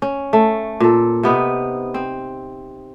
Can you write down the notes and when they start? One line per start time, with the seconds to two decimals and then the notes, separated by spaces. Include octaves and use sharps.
0.02 C#4
0.33 A3
0.80 A#2 A4
1.23 C3 B3 D#4
1.94 C4